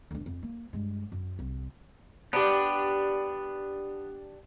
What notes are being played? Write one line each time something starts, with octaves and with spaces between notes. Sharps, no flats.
D2 D4
F2
A#3
G2 G#3
F#2
C2
B3 D4 G4